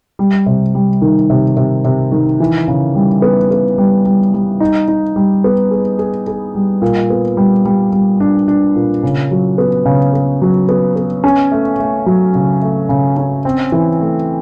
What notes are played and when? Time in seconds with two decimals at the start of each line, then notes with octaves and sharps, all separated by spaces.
0.19 G3
0.46 C3
0.75 G3
1.01 D#3
1.30 C3
1.57 C3
1.85 C3
2.12 D#3
2.40 E3
2.68 C#3
2.95 G3
3.22 B3
3.51 B3
3.78 G3
4.06 G3
4.34 G3
4.60 D#4
4.88 D#4
5.16 G3
5.44 B3
5.71 G#4
5.99 G#4
6.27 G#4
6.55 G3
6.82 A#2
7.10 B3
7.37 G3
7.65 G3
7.92 G3
8.20 D4
8.48 D4
8.76 A#2
9.03 C#3
9.31 F#3
9.58 B3
9.85 C#3
10.13 B3
10.42 F#3
10.69 B3
10.96 B3
11.24 C#4
11.52 A3
11.80 A3
12.06 F#3
12.35 C#3
12.62 A3
12.89 C#3
13.17 C#4
13.45 C4
13.72 E3
14.00 A3